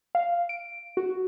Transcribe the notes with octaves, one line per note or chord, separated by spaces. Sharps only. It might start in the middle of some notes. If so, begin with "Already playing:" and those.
F5
D7
F#4